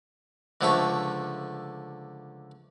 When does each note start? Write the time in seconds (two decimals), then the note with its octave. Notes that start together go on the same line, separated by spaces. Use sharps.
0.61 C#2 D3 F3 A3 E5 C#6